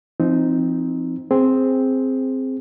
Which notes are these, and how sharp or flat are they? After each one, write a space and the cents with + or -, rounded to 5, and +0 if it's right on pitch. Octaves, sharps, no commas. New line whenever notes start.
F3 -35 C4 -5 D#4 +0
C4 +0 G#4 +0